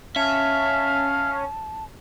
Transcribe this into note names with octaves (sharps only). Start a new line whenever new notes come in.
C#4 E5 F5 A5